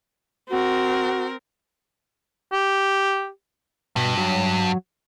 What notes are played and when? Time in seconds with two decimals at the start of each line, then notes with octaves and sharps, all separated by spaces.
0.49 C4 F#4 A#4
2.53 G4
3.96 G2 B2
4.18 F#3